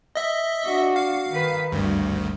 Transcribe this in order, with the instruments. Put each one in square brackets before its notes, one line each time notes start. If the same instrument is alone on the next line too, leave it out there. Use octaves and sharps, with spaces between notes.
[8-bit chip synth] D#5 E5
[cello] D4 F#4
[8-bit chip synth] F5
[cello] D#3 B4
[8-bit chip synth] G#1 D2 [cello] G2